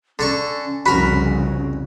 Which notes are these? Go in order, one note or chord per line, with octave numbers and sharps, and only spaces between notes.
D3 C#4 A4 C#6
C2 F2 C#3 F#4 A#4 B5